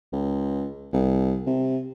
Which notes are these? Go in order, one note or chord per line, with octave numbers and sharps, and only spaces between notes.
C#2
C2
C3